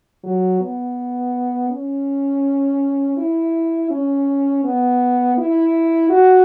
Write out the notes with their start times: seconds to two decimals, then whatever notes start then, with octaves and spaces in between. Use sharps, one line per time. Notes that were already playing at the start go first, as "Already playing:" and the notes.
0.24 F#3
0.61 B3
1.71 C#4
3.17 E4
3.91 C#4
4.64 B3
5.38 E4
6.10 F#4